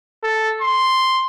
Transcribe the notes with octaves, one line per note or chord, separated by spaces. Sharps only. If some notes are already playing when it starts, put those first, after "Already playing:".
A4
C6